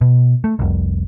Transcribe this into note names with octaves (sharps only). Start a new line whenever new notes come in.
B2
A3
F1 C2